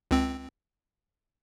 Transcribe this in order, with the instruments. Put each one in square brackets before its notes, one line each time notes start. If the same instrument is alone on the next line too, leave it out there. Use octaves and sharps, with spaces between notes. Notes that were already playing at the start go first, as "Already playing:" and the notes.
[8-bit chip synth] C#2 C4